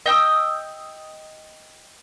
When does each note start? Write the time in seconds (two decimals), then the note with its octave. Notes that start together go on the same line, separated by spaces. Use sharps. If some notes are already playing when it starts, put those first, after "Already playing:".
0.06 D#5 G5 D#6 E6